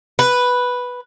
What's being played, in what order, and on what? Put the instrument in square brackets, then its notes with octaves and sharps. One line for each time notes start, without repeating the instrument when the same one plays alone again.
[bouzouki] B4